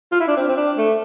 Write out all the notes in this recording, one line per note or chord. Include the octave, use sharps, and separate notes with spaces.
F4
E4
D4
C4
C4
D4
A3